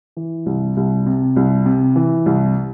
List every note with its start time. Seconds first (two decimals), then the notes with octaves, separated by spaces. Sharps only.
0.17 E3
0.46 C2
0.77 C2
1.06 C3
1.36 C2
1.66 C3
1.96 E3
2.26 C2